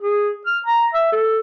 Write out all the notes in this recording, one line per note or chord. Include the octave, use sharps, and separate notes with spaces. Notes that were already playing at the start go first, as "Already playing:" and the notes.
G#4
F6
A#5
E5
A4